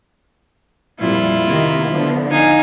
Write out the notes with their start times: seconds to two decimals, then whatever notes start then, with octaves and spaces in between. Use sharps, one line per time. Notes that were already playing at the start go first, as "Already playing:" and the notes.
1.00 F2 A#2 G3 E4 F4
1.48 C3 D#3 A#3
1.90 D3 F3 B3
2.31 D#4 F5 G#5